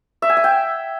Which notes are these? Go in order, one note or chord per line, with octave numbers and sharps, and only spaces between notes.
E5
G#5
E5
G5